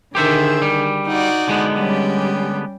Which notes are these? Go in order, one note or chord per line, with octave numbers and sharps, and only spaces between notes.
D3 D#3 G4 G#4 C5 E5
G3
D#4 F#4 D5
D3 G#3 B3
G3 C#4 G4